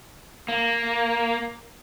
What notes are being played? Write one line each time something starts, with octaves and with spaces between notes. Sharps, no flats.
A#3